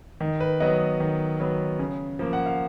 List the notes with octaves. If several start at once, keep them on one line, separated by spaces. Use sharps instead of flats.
D#3
B4
F#3 B3 D#5
D#3
F#3 B3
C#3
F3 A#3
F#5
F5